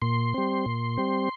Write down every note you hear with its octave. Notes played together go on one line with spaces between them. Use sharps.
A#2 C6
G3 C4
A#2
G3 C4